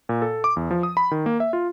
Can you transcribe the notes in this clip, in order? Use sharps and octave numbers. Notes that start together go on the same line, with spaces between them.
A#2
A4
D6
E2
F3
D#6
B5
D#3
A#3
E5
F4